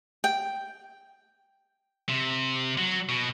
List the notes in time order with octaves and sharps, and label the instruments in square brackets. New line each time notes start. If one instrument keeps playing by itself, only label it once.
[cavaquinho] G5
[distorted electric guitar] C3
F#3
B2